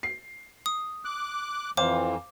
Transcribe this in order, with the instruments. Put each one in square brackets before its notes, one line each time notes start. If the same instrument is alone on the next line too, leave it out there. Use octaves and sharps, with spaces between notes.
[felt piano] C7
[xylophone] D#6
[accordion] D6 F#6
[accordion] F2 E3 [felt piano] C5 F5 [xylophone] D6